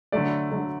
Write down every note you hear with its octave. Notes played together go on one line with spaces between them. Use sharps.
D3 F#3 A3 D5
D3 F#3 A3